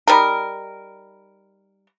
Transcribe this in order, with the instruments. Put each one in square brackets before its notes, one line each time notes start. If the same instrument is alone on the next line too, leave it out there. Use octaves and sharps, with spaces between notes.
[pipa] G3 D#4 A#4